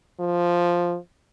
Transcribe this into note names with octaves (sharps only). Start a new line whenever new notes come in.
F3